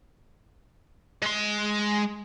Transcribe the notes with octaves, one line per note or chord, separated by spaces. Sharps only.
G#3 C6